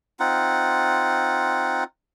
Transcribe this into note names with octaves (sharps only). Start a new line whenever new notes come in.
C4 D#4 F4 F#5